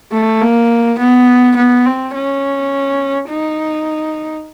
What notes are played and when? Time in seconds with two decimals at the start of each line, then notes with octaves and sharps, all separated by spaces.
0.12 A3
0.41 A#3
0.99 B3
1.57 B3
1.86 C4
2.15 C#4
3.30 D#4